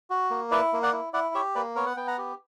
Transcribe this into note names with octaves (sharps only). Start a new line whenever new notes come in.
F#4
A#3
E4 B4 D5
A#3
D5 F#5
E4
E4 D5 F#5
G4 C#5 E5
A#3 B4 D5
B3 A#4 C#5
F#5
B3 G5
F#5 A#5
G4